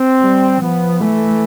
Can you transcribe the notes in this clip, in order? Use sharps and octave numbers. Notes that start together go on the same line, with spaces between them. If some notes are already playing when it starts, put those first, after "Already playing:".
Already playing: C4
G3
F3 B3
E3 A3